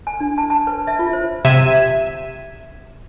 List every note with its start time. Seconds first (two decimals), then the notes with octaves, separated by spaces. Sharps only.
0.07 G#5
0.20 D4
0.38 A5
0.50 A5
0.67 B4
0.87 E5
0.99 F4
1.13 C5
1.45 C3 E5 G#6 D#7 E7